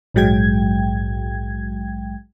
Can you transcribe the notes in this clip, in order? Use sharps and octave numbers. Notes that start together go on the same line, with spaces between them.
A#1 G#2 F#3 G#3 G5 G#6